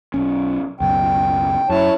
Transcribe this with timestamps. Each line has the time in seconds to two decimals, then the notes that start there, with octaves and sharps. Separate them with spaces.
0.14 B1 C#4
0.80 C#2 F#2 B2 G5
1.69 F#2 E4 C#5 A5